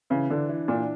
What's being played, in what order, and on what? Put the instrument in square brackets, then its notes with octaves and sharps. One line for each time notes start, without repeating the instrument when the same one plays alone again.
[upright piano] C#3 [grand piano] E3
[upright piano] D3 [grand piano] D4
[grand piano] E3
[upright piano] A#2 [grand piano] D4